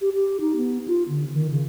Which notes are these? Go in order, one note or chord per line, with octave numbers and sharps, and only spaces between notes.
G4
G4
D#4
B3
F4
D3
D#3
C#3